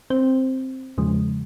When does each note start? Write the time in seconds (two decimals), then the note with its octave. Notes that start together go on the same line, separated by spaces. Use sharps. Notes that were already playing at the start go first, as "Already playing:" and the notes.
0.10 C4 C5
0.98 E2 C#3 F3 G#3